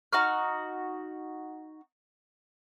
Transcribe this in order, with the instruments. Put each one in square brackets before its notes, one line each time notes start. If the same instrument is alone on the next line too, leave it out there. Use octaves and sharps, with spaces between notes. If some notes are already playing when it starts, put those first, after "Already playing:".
[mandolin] D#4 F#4 C#6 F6